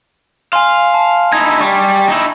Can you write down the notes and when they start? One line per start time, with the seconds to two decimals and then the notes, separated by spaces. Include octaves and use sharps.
0.53 F5 G#5 C6
0.94 A5
1.33 D#4 E4 G#6
1.61 G3 C#6
2.08 D#4 E4